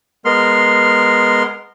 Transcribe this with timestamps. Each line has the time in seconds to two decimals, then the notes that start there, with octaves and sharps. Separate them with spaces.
0.25 G#3 B3 A#4 C6 F6